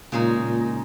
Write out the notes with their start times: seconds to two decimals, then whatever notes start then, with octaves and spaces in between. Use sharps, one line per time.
0.12 A#2 C#3 G#3 D#4
0.41 A#2